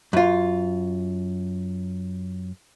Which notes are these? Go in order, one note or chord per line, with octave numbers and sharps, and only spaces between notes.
F#2 F4